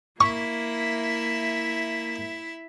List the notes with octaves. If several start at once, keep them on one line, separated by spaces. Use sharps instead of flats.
A#3 E4 E5 C#6